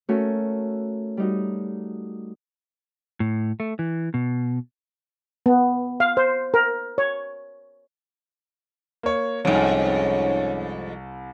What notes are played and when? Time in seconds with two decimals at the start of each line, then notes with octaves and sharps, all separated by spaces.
0.09 A3 C#4 F#4 A4 A#4
1.17 G3 D#4 F#4
3.20 A2
3.60 A3
3.79 E3
4.14 B2
5.46 B3
6.00 F5
6.17 C5
6.54 A#4
6.98 C#5
9.03 A#3 C#5
9.45 C2 F2 G#2 C#4